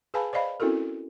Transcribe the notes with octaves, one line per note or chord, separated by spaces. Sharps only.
G#4 B4 F5 G#5 A5 B5
C5 D5 D#5 F5 B5
C4 C#4 E4 F#4 A4 A#4